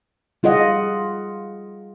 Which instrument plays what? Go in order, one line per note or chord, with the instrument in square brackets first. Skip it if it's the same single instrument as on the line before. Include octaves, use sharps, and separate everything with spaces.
[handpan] G3 F4 G#4 D#5 F#5